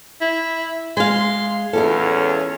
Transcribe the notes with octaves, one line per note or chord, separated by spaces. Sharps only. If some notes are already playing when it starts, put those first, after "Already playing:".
E4
G#3 F5 C6
E2 C#4 E4 F4 A4